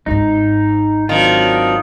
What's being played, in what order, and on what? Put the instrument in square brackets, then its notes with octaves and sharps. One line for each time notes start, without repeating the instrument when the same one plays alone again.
[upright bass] G#1 G#2 [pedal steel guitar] D#4
[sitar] D#3 [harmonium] F#3 C4 D4 [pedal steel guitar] F4